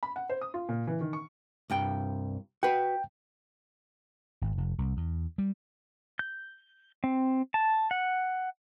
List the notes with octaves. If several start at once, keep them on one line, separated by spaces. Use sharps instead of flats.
B5
F#5
C5
D#6
F4
A#2
E3
D#3
C#6
C2 G2 G5
F#4 B4 G5
G#1
F1
C2
E2
G3
G6
C4
A5
F#5